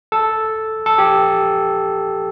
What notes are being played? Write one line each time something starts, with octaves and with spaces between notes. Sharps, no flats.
A4
A4
G4